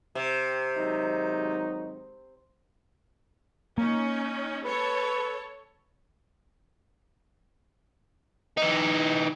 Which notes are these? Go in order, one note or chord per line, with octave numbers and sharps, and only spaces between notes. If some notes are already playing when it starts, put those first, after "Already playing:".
C3
G#1 F#3 D#4
A#3 C#4 D#4
A4 B4 C#5
E3 D#4